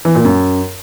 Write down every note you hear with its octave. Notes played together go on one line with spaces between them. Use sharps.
E3
A#2
F#2